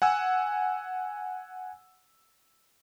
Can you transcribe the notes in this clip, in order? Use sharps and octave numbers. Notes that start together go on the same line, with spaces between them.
F#5 G#5 E6